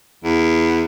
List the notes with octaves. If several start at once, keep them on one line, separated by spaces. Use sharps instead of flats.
E2